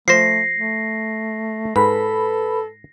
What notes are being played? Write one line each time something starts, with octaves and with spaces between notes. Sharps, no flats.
F3 A3 C5 A#6 C7
A3
G#2 A4 B4 B5